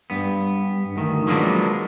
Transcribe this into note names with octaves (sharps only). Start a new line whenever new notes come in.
G2 B3
D2 D#3
F3 F#3 G#3 A#3 B3 D4